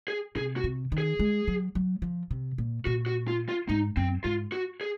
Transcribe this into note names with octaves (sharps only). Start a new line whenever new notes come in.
G#4
C3 G#4
F#4
C3
D#3
G#4
G#3
F#3
F#3
F3
C3
A#2
A#2 F#4
F#4
F4
F4
G#2 D#4
F#2 C4
G#2 F4
F#4
G#4